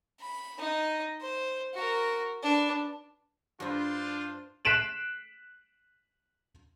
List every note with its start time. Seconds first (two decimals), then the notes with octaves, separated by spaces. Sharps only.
0.20 B5
0.59 D#4 D#5
1.21 C5
1.74 F#4 A#4
2.43 D4 B4
3.60 G2 D4 E4 F4 C5
4.65 F#6 B6 C7 D7 E7 F#7